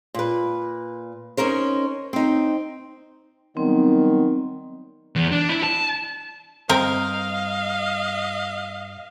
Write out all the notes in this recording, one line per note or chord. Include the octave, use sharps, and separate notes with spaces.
A#2 B4
C#4 D#4 A#4 C5
C4 D#4
D#3 F#3 G3 B3 C4
E2
D4
E4
A5
G2 C4 A#4 D#5 F5 A#5